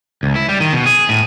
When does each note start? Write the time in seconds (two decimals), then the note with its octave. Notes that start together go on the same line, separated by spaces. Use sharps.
0.23 C#2
0.36 E4
0.49 G3
0.60 D#3
0.73 B2
0.86 G#4
1.09 A2